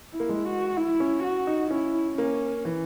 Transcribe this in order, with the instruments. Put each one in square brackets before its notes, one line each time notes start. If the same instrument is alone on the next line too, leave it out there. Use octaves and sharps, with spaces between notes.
[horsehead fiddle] E4
[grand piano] A#3
G#3
[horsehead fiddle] F#4
E4
[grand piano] C#4
[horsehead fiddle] F#4
[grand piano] D#4
[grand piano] C#4 [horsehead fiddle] E4
[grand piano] A#3 [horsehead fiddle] C#4
[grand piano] E3